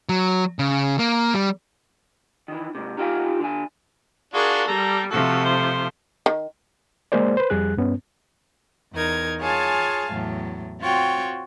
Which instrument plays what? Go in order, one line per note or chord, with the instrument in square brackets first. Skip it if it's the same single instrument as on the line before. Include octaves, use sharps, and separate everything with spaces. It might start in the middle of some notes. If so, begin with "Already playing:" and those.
[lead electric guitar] F#3
C#3
A#3
G3
[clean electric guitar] D#3 E3
G#2 C3
D#4 F4 G4 G#4 F5 G#5
D3 G#5
[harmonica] D4 F4 F#4 [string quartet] G#4 A#4 C#6
[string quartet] G3 [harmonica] A4 A#5
[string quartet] C3 F3 A3 [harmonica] F#4 A4
[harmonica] C5
[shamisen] D#3
[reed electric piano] G#3 A#3 G#4 C5 D5
B4 C5
F2 G3 G#4 F#6
G2 B3 C#4
[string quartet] E2 D#4 A#4 G#6
F4 G#4 C#5 F5 G#5 A5
E2 A2 F#3
C4 F4 F#4 C#5 G5